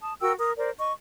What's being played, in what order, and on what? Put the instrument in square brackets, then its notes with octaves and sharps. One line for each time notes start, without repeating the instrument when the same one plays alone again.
[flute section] A5 D#6
F#4 A#4 G5 E6
A#4 D#6
A#4 C5 D5
D#5 C#6